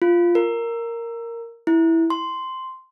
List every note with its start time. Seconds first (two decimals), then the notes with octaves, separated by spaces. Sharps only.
0.02 F4
0.35 A#4
1.67 E4
2.10 C6